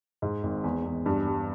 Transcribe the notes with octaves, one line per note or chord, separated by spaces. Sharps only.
G#2
G#1
E2
E2
G2
G3